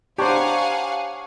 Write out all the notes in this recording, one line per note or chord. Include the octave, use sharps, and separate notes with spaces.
D4 G4 C5 C#5 F5 F#5 G#5 A#5